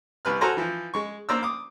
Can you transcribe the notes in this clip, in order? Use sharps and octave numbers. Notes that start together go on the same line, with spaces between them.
C2 B4 F6
F#4 A4 C5 G#5 A#5 F6
E3 F3
G#3 C#6
A#3 D4 C5 D5 A#5 E6
D6 D#6